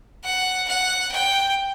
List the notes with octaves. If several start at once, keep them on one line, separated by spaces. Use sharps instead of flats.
F#5
F#5
G5